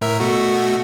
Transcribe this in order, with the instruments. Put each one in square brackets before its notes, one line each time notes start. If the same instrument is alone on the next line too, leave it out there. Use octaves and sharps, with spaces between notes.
[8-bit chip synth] A2 A#4 E5
B2 A3 F#4